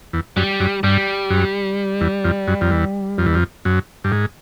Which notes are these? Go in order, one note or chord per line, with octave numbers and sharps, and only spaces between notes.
E2
F#2 G3
F#2
G2 G3
F#2
E2
F2
F#2
F2
E2
F2
E2
F2
F#2
G2
G#2